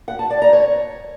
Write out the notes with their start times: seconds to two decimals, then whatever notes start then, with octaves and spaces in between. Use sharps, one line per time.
0.08 F#5
0.19 A5
0.30 D5
0.42 A#5
0.53 C#5